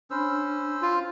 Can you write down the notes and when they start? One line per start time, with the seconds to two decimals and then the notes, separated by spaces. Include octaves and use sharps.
0.11 C#4 D4 C5 B5 E6
0.82 F4